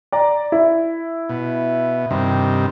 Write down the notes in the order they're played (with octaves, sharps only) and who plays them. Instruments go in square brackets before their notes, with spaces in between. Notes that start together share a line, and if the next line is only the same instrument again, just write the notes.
[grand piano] D5 A#5
E4
[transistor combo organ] B2
G2 C3 D#3